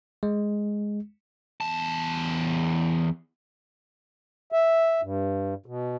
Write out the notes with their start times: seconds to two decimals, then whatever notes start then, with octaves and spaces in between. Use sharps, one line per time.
0.23 G#3
1.61 E2 A5
4.52 E5
5.02 G2
5.66 B2